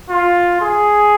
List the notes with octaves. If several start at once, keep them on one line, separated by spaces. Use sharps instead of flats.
F4
G#4